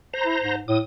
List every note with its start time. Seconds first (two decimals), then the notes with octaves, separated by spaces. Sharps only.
0.13 C5 A#5
0.25 E4
0.41 G#2
0.68 A2 D#6